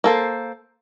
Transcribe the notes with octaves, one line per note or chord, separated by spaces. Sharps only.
A#3 A4 C5